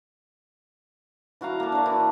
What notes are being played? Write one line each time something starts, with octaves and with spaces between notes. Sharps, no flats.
E3 F#4 F5 A#5
A#3 A5
D4 C#5
E3